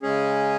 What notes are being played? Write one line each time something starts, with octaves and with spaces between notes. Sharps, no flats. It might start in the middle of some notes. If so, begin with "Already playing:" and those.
C#3 G#3 C#4 G#4